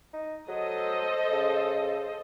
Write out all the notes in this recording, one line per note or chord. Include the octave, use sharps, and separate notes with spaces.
D#4
F#3 A4 C5 D#5
C#3